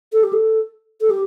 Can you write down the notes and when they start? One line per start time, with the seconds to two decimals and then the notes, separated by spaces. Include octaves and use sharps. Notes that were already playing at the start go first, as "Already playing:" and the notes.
0.13 A4
0.23 G4
0.33 A4
1.01 A4
1.10 G4